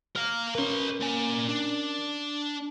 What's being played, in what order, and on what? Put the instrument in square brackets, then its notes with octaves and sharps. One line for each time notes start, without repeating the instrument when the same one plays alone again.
[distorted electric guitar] A#4 F5 [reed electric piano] F6
[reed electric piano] C#4 A#4 [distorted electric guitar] B4 C#5
[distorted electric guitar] A#2 G#5
D4